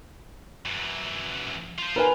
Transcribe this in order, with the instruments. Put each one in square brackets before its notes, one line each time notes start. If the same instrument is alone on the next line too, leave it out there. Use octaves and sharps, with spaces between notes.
[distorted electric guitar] F#2 E3
F4 C5
[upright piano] A#4 B4 G#5